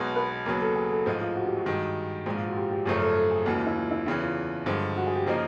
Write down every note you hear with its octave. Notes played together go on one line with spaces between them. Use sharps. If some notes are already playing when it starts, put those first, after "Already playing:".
Already playing: B1 B2 G#3 B3
B4
D#2 C#3 F#3 B3 A#4
A4
G#4
A4
A1 G#2 F3 G#3 F4
F4
F#4
G4
F#4
G2 D#3 G#3
A#1 G#2 F3 G#3
F4
F#4
G4
G4
G#1 F#2 C#3 F3 A3 G#4
A4
A4
G#4
D#2 C#3 E3 G#3 F#4
F4
E4
F4
E4
E2 C#3 E3 E4
F4
G2 D3 F3 G#3
F#4
G#4
G4
C#3 F3 A#3 D#4 G4